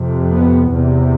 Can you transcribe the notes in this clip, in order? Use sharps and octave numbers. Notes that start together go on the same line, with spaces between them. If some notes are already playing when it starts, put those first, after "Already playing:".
Already playing: F2 C3
B3
E2 C3